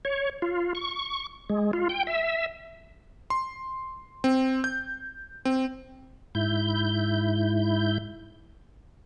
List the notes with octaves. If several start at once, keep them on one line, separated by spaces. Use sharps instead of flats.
C#5
F4
C#6
G#3
F4
G5
E5
C6
C4
G6
C4
G#2 E4 G6